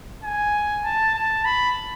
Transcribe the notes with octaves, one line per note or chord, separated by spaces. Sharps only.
G#5
A5
A5
B5